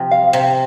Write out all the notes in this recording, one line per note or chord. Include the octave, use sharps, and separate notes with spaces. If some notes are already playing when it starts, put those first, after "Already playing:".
Already playing: C3 F3
F5
C3